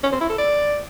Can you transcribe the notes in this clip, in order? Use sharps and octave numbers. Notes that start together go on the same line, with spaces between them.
C#4
C4
E4
A4
D5